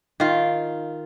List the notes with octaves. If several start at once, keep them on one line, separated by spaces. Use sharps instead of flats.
D#3 F4